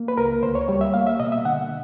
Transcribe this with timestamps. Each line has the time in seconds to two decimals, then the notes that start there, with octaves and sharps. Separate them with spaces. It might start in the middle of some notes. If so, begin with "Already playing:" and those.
Already playing: A#3
0.08 B4
0.17 C#2 A#4
0.43 D2 C5
0.55 C#5
0.68 G3 C#5
0.81 E5
0.94 A#3 F5
1.07 E5
1.20 B2 D#5
1.32 E5
1.45 D3 F#5